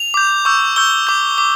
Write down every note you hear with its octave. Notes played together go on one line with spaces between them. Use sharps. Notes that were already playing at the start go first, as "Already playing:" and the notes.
Already playing: F7
D6 G6
C#6 E6 G6
C#6 E6 G6 G7
D6 G6
D6